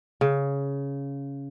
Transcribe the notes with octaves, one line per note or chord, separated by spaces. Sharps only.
C#3